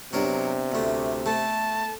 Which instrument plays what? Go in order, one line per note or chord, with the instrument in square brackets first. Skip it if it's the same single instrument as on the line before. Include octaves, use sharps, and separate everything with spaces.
[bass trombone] C3 [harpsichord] F#3 A#4 [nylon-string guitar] B3 D4 G4
[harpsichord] D2 A3
[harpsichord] A3 [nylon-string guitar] A4 [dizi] A5